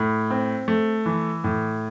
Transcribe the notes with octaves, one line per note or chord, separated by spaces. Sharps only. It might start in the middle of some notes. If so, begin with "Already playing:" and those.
Already playing: A2
C4
A3
E3
A2